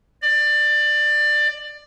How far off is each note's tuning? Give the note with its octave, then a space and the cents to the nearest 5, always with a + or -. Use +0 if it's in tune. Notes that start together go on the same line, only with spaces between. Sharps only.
D5 +20